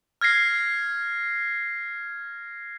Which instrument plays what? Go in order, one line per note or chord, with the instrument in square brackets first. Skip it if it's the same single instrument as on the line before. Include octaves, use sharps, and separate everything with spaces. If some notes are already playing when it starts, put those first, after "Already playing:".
[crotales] F6 G#6 A#6 C7